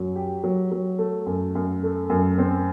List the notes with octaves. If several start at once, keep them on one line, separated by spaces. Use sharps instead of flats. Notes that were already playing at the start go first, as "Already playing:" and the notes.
Already playing: F#2 F#3
G4
F#3
F#3
A3
F#2
F#2
A3
F#2
C4